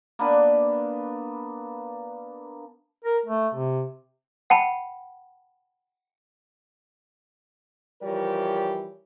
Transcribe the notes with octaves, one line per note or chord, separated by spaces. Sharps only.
A#3 B3 D4 B4
A#4
A3
C3
F#5 G5 A5 B5
E3 F3 G3 G4 A#4 C#5